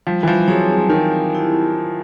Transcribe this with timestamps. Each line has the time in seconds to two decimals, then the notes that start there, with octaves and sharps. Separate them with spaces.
0.07 F3 G3
0.23 E3
0.28 F3
0.48 F#3 C4 D#4 G#4 C#5
0.90 D#3 C4
1.31 E4 G4
1.72 F4